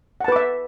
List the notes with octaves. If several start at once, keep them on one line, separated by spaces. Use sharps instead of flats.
B4 E5 F#5 A5 D6